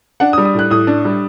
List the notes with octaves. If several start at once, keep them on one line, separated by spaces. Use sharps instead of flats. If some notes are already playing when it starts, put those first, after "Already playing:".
D4 F#5
D#6
G3
D#6
A2 F#6
A2 D#6
D4
G3